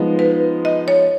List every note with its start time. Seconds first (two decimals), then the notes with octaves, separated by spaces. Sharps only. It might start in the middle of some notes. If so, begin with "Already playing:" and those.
Already playing: F3 G#3 B3 D#4
0.19 B4
0.65 D#5
0.88 C#5